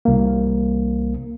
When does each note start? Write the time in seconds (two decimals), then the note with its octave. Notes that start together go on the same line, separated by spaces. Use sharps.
0.05 C2 A#3